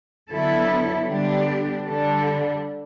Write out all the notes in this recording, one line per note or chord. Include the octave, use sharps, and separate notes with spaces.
D3 F#3 B3 E4 A4
D3 G3 B3 D4 G4
D3 G3 D4 A4